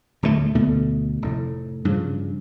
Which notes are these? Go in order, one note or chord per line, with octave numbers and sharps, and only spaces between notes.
D1 D2 F3 A3
D2 B2 D3 A3
F1 A2
G2 C#3 F3